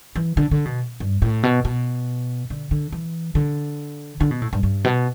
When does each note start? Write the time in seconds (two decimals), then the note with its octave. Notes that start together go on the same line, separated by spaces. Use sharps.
0.16 E3
0.37 D3
0.51 D3
0.65 B2
1.00 G2
1.22 A2
1.43 B2
1.65 B2
2.50 D3
2.71 D3
2.92 E3
3.35 D3
4.20 D3
4.31 B2
4.42 A2
4.53 G2
4.63 G2
4.84 B2